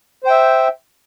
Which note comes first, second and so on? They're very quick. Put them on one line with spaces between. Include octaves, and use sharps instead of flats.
C5 G5 E5